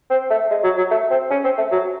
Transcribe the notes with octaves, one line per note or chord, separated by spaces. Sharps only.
C4
A3
G#3
F#3
F#3
A3
C4
C#4
C4
A3
F#3